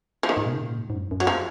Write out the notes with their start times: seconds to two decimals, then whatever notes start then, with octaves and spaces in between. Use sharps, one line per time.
0.23 F3
0.29 D#3
0.37 G#2
0.46 B2
0.54 C#3
0.62 A#2
0.78 G#2
0.90 G#2
0.95 F#2
1.11 F#2
1.20 F#3
1.27 F3